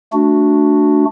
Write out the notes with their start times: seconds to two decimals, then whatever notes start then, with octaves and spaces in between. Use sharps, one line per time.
0.13 A3 D4 F#4